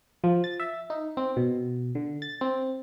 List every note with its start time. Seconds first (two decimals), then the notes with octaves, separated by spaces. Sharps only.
0.24 F3
0.44 A6
0.60 E5
0.90 D#4
1.17 C4
1.37 B2
1.95 D3
2.22 A6
2.41 C4